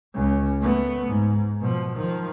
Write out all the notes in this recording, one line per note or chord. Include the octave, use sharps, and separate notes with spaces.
C#2 C#3
A3 B3
G#2
B2 F3
D#3 F3